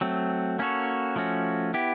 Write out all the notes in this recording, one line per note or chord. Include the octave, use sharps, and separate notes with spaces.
F#3 A3 C4
A#3 C#4 F#4 A4 C#5
F3 A3 C#4 F#4
B3 E4 G4